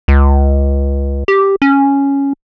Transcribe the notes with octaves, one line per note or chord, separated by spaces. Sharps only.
C#2
G4
C#4